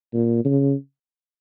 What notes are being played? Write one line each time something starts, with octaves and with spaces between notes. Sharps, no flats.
A#2
C#3